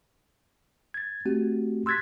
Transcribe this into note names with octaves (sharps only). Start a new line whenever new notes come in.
G#6 A6
A3 C4 F#4 G4
C6 E6 F#6 G#6 A6 B6